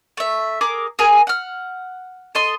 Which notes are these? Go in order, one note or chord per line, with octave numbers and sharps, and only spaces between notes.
A3 E5
G#4 A#4 D6
G#4 A#4 G#5
F#5 F6
A4 D#5 C6